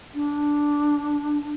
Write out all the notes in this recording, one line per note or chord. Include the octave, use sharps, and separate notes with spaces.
D4